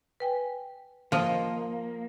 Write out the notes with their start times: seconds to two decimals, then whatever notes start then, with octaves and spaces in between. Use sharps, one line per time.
0.20 B4 G5 G#5
1.12 F3 A#3 D#5